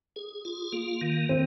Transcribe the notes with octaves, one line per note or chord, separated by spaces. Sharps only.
G#4
F4
A#3
D#3
D#3 C4 C5